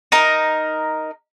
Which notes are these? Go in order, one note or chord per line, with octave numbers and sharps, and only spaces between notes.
D#4 A#4